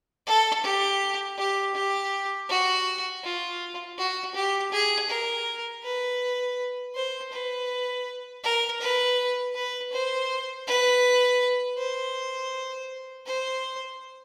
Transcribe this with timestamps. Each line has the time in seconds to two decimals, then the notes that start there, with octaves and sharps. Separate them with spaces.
0.26 A4
0.63 G4
1.38 G4
1.75 G4
2.49 F#4
3.24 F4
3.98 F#4
4.35 G4
4.72 G#4
5.09 A#4
5.83 B4
6.95 C5
7.32 B4
8.43 A#4
8.81 B4
9.55 B4
9.92 C5
10.67 B4
11.78 C5
13.26 C5